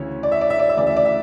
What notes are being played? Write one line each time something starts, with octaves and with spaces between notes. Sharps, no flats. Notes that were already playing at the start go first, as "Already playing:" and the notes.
Already playing: D2 C#3 E3 C#5
D5
E5
D5
E5
D5
E5
D2 C#3 E3 D5
E5
D5
E5